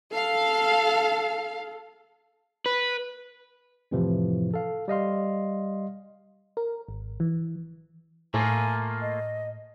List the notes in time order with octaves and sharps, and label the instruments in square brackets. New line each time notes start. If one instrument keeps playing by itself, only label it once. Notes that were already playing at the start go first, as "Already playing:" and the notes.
[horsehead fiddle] A4 [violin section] F5
[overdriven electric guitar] B4
[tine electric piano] F2 A2 C3 E3 F3
A4 F5
G3 D#5 F5 C6
[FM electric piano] A#4
G#1
E3
[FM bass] A2 [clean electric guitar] A3 A#3 F4 [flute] G#5
[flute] D#5